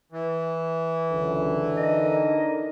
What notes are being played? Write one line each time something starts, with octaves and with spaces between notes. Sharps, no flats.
E3
C#2 F#2 D3
D4 D#4 A#4 D#5